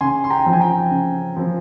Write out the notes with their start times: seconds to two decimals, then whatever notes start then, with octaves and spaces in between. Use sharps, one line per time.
0.01 C#3 G#5 C6
0.24 C6
0.30 G5 A#5
0.46 F3 C4
0.53 G#5
0.61 G5 A#5
0.91 C#3
1.37 F3 C4